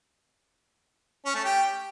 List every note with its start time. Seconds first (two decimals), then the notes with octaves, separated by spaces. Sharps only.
1.25 C#4
1.35 A3
1.44 G4